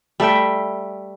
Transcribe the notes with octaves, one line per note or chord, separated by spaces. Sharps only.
G3 A3 E5 G5